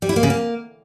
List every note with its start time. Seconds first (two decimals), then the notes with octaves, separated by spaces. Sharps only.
0.02 G3
0.09 E4
0.16 A#3
0.23 C#3
0.30 A#3